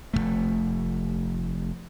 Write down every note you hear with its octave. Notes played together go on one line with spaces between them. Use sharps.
F1 F2 A3